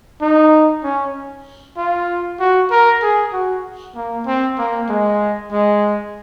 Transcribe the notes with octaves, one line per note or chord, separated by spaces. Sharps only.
D#4
C#4
F4
F#4
A#4
G#4
F#4
A#3
C4
A#3
G#3
G#3